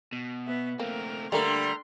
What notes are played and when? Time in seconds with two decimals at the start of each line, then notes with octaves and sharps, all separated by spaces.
0.12 B2
0.47 B3 E5
0.79 A3 A#3 C4 A#4
1.32 D3 G3 A3 A#3 A#4 A#5 C6